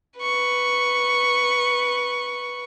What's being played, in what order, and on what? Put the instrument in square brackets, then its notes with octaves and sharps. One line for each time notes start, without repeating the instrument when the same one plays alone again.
[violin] B4 C#6